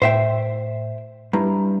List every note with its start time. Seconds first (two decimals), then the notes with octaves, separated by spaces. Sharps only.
0.02 A2 C5 E5 G5
1.33 G2 E4 B4 A#5